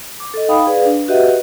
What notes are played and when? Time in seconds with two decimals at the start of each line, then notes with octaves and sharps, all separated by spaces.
0.20 D6
0.34 A4 D#5
0.48 D#4 F5 G5 B5 D#6
0.67 G#4 B4 D5 F5
0.85 D4
1.08 F#4 G4 B4 D#5 E5 F#5